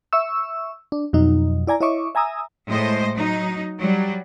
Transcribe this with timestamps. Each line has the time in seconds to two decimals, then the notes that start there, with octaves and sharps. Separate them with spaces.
0.13 E5 C#6 E6
0.92 D4
1.13 F2 B2 F#3 D#4
1.67 E4 D5 G#5 A#5
1.80 E4 C#5 D#5 E5 C#6 D6
2.15 E5 G#5 A#5 D#6 E6
2.68 A2 G#3 C5 D#5
3.14 F#3 D#4
3.79 F#3 G3